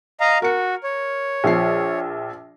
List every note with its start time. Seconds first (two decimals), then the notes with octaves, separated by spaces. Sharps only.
0.20 D#5 F5 A#5
0.42 F#4 A#4 C#7
0.84 C#5
1.44 A#1 F3 C7